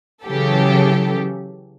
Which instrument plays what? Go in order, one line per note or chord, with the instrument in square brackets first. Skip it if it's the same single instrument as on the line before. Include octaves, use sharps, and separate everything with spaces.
[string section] C#3 E3 F#3 G4 A4